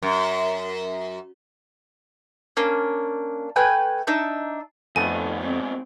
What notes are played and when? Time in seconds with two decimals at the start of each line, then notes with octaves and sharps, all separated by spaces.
0.02 F#2
2.57 A#3 C#4 D4
3.56 A3 B4 G5 G#5
4.07 D4 D#4 E5 G6
4.96 F2 A2 D#3 A3 B3 G#5
5.42 G#2 B2 C4